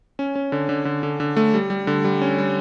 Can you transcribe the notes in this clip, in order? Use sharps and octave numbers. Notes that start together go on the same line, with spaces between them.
C#4
C#4
D3
D3
D3
D3
D3
A3
G3
G3
D3
G3
C#4
G3